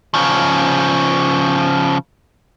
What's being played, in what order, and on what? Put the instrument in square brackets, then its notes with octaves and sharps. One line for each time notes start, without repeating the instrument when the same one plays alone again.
[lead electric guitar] C#3 F3